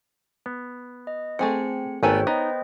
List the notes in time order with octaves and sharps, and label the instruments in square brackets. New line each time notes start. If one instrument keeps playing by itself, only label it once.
[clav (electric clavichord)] B3
[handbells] D#5
[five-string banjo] A3 G#4 C5 [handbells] C4 C#7
[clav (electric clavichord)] G#1 A3 A4 [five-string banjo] B3 G#5 A#5 [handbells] C#5 G5
[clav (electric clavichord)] B3 [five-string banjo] D#4 [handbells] C5 D#5 G5